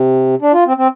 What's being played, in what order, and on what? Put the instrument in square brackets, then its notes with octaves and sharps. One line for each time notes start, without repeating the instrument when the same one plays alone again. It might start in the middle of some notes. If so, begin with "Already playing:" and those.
Already playing: [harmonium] C3
D4
F4
C4
C4